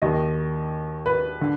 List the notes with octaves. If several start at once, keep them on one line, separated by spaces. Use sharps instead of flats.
D#2 D#3 D#5
B4
D3